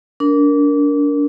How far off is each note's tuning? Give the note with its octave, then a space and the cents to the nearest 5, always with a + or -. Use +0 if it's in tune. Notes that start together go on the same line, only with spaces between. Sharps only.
D4 -30 A#4 +0